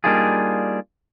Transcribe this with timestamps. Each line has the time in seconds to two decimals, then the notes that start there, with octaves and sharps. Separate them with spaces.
0.04 G3 A#3 D4 D#4 F4 G#4